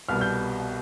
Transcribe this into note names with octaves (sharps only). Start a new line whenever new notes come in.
C2 B2 G3 F6
G6